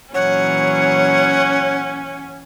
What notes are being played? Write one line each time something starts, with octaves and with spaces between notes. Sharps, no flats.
A#2 E3 F#3 C#4 C#5 F#5